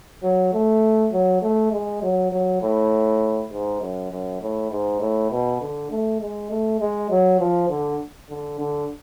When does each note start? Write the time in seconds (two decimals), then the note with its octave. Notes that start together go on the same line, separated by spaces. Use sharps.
0.23 F#3
0.53 A3
1.13 F#3
1.42 A3
1.72 G#3
2.03 F#3
2.32 F#3
2.62 A2
3.52 G#2
3.81 F#2
4.11 F#2
4.42 A2
4.71 G#2
5.01 A2
5.31 B2
5.61 D3
5.91 A3
6.21 G#3
6.50 A3
6.80 G#3
7.10 F#3
7.40 F3
7.70 D3
8.30 D3
8.59 D3